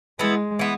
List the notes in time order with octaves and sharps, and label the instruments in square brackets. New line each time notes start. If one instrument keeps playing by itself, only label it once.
[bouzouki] E3 B3 E4 [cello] G#3
[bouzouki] E3 B3